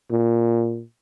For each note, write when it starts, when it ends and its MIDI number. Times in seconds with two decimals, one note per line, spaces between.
0.11 0.83 46